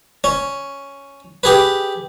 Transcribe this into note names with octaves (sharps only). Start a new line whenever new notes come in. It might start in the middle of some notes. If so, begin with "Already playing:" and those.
C#4
G4 G#4 B4